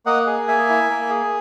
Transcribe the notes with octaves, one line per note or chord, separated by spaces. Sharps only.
A#3 D#5 F#5
G#4
A#3 E5 G#5
E4
A#3
G#4